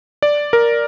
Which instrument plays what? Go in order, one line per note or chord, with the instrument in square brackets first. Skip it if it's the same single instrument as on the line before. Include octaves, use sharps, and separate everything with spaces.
[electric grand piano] D5
A#4